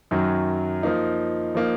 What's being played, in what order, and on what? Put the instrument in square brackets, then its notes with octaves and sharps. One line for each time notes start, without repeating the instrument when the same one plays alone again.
[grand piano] F#2 D#3 F#3
F3 A#3 D#4
F3 A#3 D#4